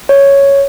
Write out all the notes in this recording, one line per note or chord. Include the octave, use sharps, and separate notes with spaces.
C#5